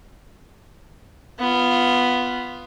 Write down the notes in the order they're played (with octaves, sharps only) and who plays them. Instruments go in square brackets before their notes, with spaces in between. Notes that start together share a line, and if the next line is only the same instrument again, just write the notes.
[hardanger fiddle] B3 F4